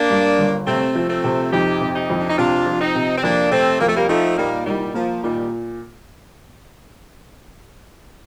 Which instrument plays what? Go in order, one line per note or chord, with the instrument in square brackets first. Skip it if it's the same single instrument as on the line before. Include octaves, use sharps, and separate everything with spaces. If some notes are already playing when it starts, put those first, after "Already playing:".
Already playing: [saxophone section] A#3 D4
[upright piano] G2
G1
[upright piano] C3 [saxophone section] A3 C4
[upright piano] F3
[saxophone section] A3 C4
[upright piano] C3
[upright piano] F2 [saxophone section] D#4 G4
[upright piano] C3
[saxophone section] D#4 G4
[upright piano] F2
[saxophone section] D4
D#4
[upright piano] C3 [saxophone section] D4 F4
[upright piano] F3
[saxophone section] C4 D#4
[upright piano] C3
[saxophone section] C4
[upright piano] F2 [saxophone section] A#3 D4
[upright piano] C3 [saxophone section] A3 C4
[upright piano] F2 [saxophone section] A#3
[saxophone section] A3
G3 A#3
[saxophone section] F3 A3 [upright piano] D#4
[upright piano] A#2 [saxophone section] G3 A#3
[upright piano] C2 [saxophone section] D#3 G3
[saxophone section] F3 [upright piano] A#3
[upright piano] A#2 [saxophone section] D#3 G3